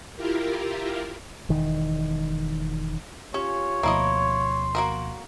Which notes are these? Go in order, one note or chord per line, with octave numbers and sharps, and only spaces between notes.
E4 F4 G4 A#4
E1 E2 D#3
C#4 F4 G4 C#5
D2 B2 F3 A#3 E4 D#5 C6
A#3 F#4 A#4